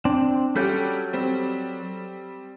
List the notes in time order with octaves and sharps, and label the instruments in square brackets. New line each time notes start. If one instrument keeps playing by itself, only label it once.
[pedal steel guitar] C4 D4
[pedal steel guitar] F#3 A4 G6 [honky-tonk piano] G3 C#4 G4
[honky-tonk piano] G3 C4